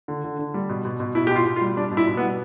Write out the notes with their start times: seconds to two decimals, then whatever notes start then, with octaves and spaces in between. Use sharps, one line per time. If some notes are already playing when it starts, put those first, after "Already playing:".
0.08 D3
0.24 D3
0.39 D3
0.54 G3
0.69 B2
0.85 B2
1.00 B2
1.15 B2 E4
1.27 G4
1.31 B2 F4
1.46 B2
1.56 F4
1.61 G3
1.77 G3 D4
1.91 B2
1.97 E4
2.07 B2
2.17 B3
2.22 G3